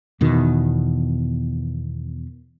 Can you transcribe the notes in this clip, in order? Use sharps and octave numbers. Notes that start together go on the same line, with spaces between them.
E2 B2 D#3